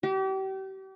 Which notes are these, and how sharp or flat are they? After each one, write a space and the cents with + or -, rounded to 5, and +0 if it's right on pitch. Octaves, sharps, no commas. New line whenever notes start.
G4 -35